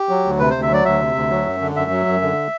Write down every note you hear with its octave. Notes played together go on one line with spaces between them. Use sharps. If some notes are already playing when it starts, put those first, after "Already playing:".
Already playing: G4
F#3
D2
C3 B4
D2 C5
E5
F#3 D5
D2 E5
C3
D2
F#3
F#2
D3
F#2 E5
F#3
F#2
D3